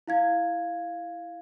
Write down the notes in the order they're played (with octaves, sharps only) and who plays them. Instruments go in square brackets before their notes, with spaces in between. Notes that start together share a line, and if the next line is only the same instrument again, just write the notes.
[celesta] E4 F5 G#6